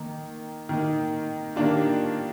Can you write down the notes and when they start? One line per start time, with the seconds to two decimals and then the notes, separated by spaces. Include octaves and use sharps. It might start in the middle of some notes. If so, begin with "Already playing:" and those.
Already playing: D#3 A#3 D#4
0.69 D#3 A#3 D#4
1.56 D#3 G3 A#3 D4 F4